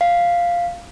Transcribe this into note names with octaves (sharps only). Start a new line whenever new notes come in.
F5